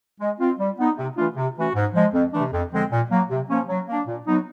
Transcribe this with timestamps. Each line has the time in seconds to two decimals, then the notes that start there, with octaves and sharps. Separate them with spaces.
0.21 G#3
0.40 C4 F4
0.59 G3
0.79 B3 D#4
0.98 C3
1.17 E3 A3 D4 F4
1.36 C3
1.56 E3 A3 C#4 F#4
1.75 G#2
1.94 F3 G#3
2.14 F2
2.33 C3 E3 A3 D4
2.53 F2
2.72 D3 F3 G#3 C4
2.92 A#2
3.11 F#3 A#3
3.30 C3
3.50 F3 A#3 C#4
3.69 F#3
3.88 A#3 D4
4.07 A#2
4.27 F#3 B3 D#4